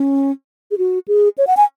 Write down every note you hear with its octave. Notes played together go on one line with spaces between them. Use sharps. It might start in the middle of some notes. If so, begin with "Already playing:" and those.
Already playing: C#4
G#4
F#4
G#4
C#5
F#5
G#5